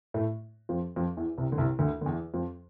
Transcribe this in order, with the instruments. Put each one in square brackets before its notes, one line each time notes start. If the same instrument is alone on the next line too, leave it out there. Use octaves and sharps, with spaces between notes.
[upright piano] A2 A3
F2 F3
F2 F3
E2 E3
C2 C3
D3
C2 C3
D2 D3
D3
E2 E3
F2 F3